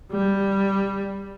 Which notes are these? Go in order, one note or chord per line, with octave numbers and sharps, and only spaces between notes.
G3